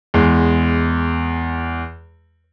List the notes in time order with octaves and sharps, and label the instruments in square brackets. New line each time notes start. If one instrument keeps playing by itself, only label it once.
[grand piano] E2 G#3